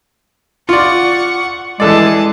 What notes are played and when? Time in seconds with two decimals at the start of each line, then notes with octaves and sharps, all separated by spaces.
0.69 F4 D5 F#5 C#6
1.80 E3 G#3 G#4 A4 D5 A5